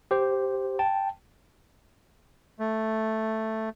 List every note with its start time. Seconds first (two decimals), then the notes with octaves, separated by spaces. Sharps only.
0.11 G4 C5
0.79 G5 A5
2.60 A3